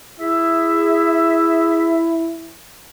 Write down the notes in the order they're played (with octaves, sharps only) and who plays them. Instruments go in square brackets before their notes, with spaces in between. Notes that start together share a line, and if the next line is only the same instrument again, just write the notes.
[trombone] E4 [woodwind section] G#4 E5